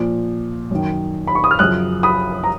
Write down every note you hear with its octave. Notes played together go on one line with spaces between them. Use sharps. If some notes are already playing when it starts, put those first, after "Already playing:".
Already playing: A#2 F3
F#2 D#3
B5
C#6
D#6
F6
F#2 C#3 F3 D#6 F#6
B5 D#6
A#5